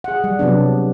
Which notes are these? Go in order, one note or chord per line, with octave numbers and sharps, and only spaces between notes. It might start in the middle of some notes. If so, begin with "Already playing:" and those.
G#4 F#5
G3
C3 F#3 B3 D4